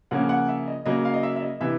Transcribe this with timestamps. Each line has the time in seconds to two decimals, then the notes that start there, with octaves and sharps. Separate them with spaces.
0.11 C#3 F3 A#3 C#4 F#5
0.29 F#5
0.49 E5
0.68 D#5
0.86 C#3 F#3 A#3 D#5
1.05 F5
1.14 D#5
1.23 E5
1.36 E5
1.42 D#5
1.60 C3 E3 E5